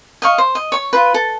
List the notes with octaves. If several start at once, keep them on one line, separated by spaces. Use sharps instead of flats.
D#5 F5 C#6
C5
D#5
C#5 C#6
F4 B4
A4